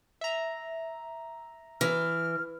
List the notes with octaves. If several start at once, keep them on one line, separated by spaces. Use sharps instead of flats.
E5 A#5
E3 F6